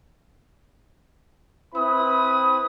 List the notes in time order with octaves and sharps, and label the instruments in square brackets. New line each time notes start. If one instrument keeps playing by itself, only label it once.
[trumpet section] C4 E4 B4 B5 D#6